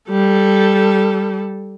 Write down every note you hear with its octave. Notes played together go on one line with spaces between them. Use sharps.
G3 A4